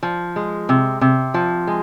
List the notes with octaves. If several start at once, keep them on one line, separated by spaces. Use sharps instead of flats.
F3
G#3
C3
C3
F3
G#3